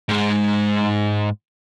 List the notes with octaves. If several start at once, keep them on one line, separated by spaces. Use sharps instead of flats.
G#2 G#3